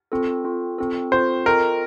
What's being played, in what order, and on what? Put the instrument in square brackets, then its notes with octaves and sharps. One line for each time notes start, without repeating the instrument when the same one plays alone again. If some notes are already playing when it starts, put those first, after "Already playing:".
[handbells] C4 F4 A4
C4 F4 A4
C4 F4 A4
[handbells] C4 F4 A4 [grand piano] C5
[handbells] C4 F4 A4 D#5 G5 [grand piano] A#4